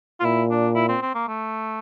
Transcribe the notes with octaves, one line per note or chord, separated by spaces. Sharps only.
F4
A#2 E4
D4
E4
C4
C4
A#3
A3